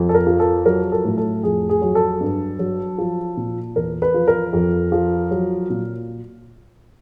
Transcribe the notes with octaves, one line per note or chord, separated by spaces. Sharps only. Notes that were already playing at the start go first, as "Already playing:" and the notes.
Already playing: F2
A4
A#4
F3
A4
F#3 A#4
A4
A2
A4
F2 G#4
G#4
F#3
A4
G2
F#3
F3
A#2
E2 A#4
B4
F3
A#4
F2
F3
F#3
A#2